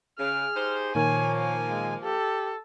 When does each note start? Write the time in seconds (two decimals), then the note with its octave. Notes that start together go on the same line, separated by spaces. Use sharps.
0.19 C#3 G#4 F6
0.56 D#4 G4 C5
0.95 A#2 D#3 F3 A#3 A#4 C#5 G#5
1.37 G#5
1.70 G#3
2.04 G4 A4